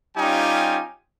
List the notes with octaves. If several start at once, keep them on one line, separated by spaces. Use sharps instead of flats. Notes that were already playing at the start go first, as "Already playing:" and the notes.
G3 C#4 D#4 F4 G4 G#5